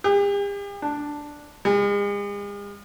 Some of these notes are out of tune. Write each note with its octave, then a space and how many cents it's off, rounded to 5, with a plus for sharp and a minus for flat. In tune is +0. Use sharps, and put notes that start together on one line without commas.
G4 +45
D4 +0
G#3 -40